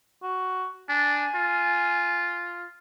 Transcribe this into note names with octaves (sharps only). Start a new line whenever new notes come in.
F#4
D4 G#5
F4